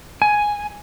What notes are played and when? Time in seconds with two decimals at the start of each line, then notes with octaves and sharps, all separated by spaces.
0.22 G#5